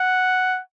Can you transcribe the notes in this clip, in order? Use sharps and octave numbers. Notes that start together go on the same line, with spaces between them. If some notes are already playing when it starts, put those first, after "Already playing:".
Already playing: F#5